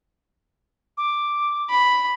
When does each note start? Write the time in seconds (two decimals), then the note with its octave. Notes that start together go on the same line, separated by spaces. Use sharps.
0.98 D6
1.70 B5